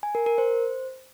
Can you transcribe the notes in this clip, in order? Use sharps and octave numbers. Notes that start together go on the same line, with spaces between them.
G#5
A#4
A#4
C5